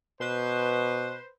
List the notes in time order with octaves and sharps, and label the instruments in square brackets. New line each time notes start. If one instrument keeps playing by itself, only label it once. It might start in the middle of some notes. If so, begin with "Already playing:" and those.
[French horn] B2 [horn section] B4 C5